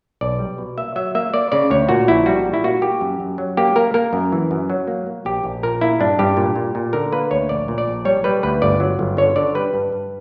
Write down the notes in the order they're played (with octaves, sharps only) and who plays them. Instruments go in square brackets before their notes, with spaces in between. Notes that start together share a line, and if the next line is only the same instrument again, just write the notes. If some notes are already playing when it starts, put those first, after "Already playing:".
[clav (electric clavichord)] B1 D5
G3
B2
A#3 E5
F#3 E5
A#3 E5
A#3 D5
C#3 D5
D2 C#5
A#2 F#4
A#1 E4
G3 F#4
A#2
E4
A#3 F#4
A#3 G4
F#2
F#2
F#3
A#3 G4
A#3 A#4
A#3 A#4
F#2
E3
F#2
F#3
A#3
A#3
A#1 G4
A#1
A#2 A#4
A#3 E4
G2 D4
G2 G4
A#2
A#2
A#2
D3 A#4
A#3 B4
D2 C#5
A#1 D5
A#2
D5
A#1
G3 C#5
G3 B4
D2 B4
G1 D5
F#3
G1
D3 C#5
D3 D5
G3 B4
G2
G2